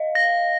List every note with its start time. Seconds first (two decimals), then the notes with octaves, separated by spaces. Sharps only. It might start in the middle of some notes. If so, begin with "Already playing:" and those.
Already playing: D#5 F5
0.15 A#6